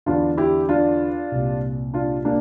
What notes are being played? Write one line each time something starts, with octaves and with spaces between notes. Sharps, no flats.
E2 D3 D4 F4
E4 G4
D4 F4
C2 A#2
D4 F4
A#3 D4